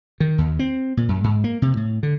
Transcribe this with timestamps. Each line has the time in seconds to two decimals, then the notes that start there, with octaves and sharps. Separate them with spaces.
0.20 D#3
0.38 D#2
0.59 C4
0.97 A#2
1.09 F#2
1.24 G#2
1.44 A#3
1.62 C3
1.77 A2
2.03 D3